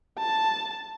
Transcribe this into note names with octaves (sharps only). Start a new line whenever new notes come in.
A5